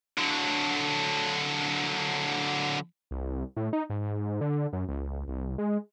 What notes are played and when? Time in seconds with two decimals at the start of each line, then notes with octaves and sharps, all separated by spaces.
0.18 D3 F#3
3.11 C2
3.57 A2
3.73 D#4
3.90 G#2
4.41 D3
4.73 F#2
4.89 C#2
5.28 C2
5.58 G#3